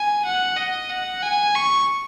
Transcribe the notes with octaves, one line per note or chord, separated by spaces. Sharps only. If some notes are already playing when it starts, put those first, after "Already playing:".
Already playing: G#5
F#5
D#5
F#5
G#5
C#6